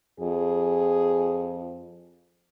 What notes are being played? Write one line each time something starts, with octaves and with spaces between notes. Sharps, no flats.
F2 G#4